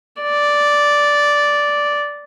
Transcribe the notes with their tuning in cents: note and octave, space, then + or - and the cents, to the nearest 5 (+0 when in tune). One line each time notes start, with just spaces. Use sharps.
D5 -5